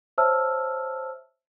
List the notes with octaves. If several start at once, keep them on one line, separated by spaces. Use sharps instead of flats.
C5 C#5 E5 A5 E6 F6